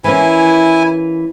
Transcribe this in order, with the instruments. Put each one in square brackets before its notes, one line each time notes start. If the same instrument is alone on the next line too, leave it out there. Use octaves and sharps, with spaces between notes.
[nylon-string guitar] E3 A#3 C#4 [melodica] E4 G#5